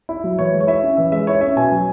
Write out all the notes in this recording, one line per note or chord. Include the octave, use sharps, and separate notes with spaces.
E4
F#3
E3 C#5
G#3
C#5
E4 E5
C#4
E3 E5
G#3 E5
E4 C#5
C#4 E5
B2 G#5
F#3